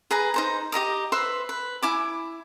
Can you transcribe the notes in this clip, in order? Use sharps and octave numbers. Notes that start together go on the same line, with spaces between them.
G#4 B4 G#5 A#5
D#4 C5 A#5
G4 D#5 A#5 D#6
B4 C5 E5 C6
B4
E4 G#5 D6